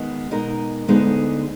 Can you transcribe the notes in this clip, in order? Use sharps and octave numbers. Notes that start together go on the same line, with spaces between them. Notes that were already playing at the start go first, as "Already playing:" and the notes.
Already playing: D#3 G#3 B3
B2 G#3 D#4 A#4
D2 D3 G#3 B3 D#4